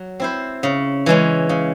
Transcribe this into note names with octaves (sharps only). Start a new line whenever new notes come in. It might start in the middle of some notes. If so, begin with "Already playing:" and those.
Already playing: F#3
C4 E4 C5
C#3
E3 G#3 C#4
C#3